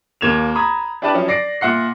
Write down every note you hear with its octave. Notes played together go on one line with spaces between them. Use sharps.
D#2 A#3 G#6 E7 F7
A#5 B5 D#6 G#6
D4 E4 G4 B4 D5 A5
F3 F#3 C#4 E4
D5 A#6 C7 D7
A#2 E5 F#5 C7